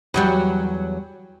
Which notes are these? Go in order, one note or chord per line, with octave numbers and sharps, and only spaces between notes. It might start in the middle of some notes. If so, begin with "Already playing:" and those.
E2 F#3 G3